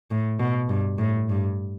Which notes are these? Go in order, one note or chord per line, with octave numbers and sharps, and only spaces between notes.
A2
B2
G2
A2
G2